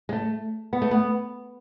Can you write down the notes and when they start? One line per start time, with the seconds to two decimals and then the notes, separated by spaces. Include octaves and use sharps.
0.09 G#3
0.13 A3
0.73 B3
0.82 A3
0.91 B3